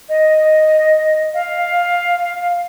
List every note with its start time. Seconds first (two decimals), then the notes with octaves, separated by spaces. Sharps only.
0.09 D#5
1.34 F5